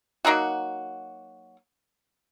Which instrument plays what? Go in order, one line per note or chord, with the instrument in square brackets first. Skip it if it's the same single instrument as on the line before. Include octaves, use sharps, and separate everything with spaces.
[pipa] F#3 A#3 D#4 F#4